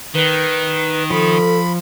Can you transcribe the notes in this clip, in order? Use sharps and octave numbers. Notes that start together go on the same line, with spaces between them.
D#3 B4
F3 A4 B5